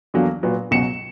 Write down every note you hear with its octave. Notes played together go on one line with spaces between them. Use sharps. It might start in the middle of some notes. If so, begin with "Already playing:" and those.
E2 D3 F#3 A#3
A#2 F#3 B3
C#2 B2 F#3 C#7 E7